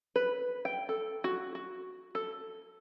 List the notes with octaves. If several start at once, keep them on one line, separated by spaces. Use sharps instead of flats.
B4
G5
A4
F#4
F#4
A4